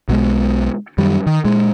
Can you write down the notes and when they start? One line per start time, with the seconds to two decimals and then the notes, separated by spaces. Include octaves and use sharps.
0.09 B1 B2 G#3
0.98 F#2 D#3 G3
1.27 D#3
1.45 A#2 G#3